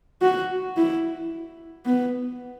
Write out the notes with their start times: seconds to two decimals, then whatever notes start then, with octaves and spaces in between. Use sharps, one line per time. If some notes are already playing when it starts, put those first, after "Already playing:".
0.22 F#4
0.77 E4
1.86 B3